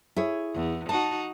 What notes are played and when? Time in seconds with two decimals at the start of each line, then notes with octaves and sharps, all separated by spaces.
0.16 E4 G#4 C#5
0.54 E2
0.89 D#4 F#4 A5